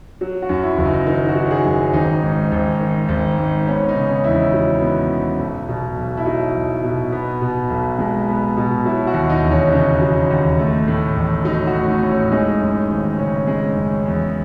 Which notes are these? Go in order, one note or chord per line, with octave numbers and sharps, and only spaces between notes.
F#3
F#4
F#2
E4
F#1
D#4
D#3 D#4
F#4
F#3
G#4
F#2
G#1 D#4
G#2
G#1
D#3
G#1
G#2
B3 C#4
D#4
C#3
C#4
E2 E4
D#4
F#3
B3
C#3
B1
B2
B1
E4
F#3 D#4
B1
B2
B3
B2
B1
G#3
B3
B2
F#3 E4
F#4
D#2
D#4
E1
C#4
C#3 D#4
F#3
D#2
A3
A2
A1
F#3 D#4
F#4
A3
D#4
A2
C#4
G#3 D#4
F#2
G#1
C#3 C#4
G#3
F#2
E2